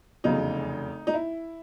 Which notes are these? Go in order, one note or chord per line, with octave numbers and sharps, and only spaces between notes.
F1 E2 C#3 F#3 D#4
D#4
E4